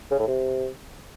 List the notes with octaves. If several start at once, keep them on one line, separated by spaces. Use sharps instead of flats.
C#3
A2
C3